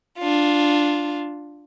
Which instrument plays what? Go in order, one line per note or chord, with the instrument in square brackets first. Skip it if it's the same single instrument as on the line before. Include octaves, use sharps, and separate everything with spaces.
[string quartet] D4 F4